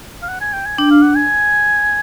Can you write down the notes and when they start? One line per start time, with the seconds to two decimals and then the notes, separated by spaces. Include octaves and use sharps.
0.22 F5
0.29 F#5
0.41 G#5
0.53 G5
0.66 G#5
0.78 D4 G5
0.91 F5
1.03 F#5
1.16 G#5